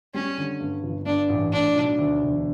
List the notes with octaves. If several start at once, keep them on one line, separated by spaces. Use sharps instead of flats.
G3 C#4
D3
G2
G1
G2 D4
A1
A2 D4
B1
D2
E1